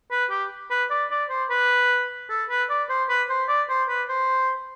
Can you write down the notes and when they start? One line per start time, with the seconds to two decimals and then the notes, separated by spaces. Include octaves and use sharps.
0.11 B4
0.30 G4
0.70 B4
0.91 D5
1.11 D5
1.30 C5
1.50 B4
2.30 A4
2.49 B4
2.70 D5
2.90 C5
3.09 B4
3.29 C5
3.49 D5
3.69 C5
3.89 B4
4.09 C5